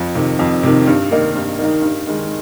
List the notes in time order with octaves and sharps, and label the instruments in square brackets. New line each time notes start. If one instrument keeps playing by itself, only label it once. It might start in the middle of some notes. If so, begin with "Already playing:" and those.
Already playing: [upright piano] F2
C3 D#3
F2
C3 D#3
G2
D#3 A#3 D#4
G2
D#3 A#3 D#4
G2
D#3 G#3